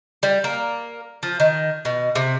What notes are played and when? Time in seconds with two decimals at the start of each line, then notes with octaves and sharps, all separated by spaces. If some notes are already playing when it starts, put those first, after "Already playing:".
0.23 G3
0.44 A#3
1.23 F3
1.40 D#3
1.85 B2
2.15 C3